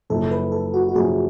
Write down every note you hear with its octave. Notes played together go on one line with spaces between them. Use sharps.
F#1 F#2 F3 A4
B4
A4
F#4
F#4
F#1 F#2 F3 G#4